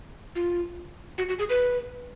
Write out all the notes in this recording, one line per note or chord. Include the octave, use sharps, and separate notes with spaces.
F4
F#4
F#4
G#4
B4